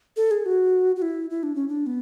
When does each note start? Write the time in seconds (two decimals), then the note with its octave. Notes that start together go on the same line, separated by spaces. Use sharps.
0.17 A4
0.31 G#4
0.46 F#4
0.96 F#4
1.02 E4
1.30 E4
1.43 D4
1.55 C#4
1.68 D4
1.86 B3